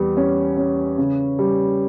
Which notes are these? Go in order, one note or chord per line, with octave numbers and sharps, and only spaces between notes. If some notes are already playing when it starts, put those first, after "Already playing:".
Already playing: E2 G3
C#4
C#4
C#3
G3